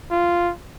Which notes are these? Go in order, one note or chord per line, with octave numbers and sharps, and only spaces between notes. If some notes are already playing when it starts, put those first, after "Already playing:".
F4